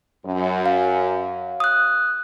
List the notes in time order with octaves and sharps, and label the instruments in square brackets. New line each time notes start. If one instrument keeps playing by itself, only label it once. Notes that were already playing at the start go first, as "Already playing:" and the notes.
[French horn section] F#2
[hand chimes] F5
D#6 F#6